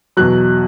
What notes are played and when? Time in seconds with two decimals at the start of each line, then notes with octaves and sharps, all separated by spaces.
0.17 E2 B2 F#3 F#6